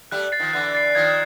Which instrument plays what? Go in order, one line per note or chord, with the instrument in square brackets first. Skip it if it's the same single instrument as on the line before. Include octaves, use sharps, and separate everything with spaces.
[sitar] G3 A3 [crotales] F#6
[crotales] A6 C7
[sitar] D#3 F3
[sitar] D3 E3 [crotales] F#6
[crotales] A6 C7
[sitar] D#3 F3 [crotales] G#6